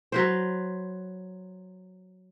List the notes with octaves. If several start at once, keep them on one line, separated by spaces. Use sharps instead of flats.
F#3 B4 C5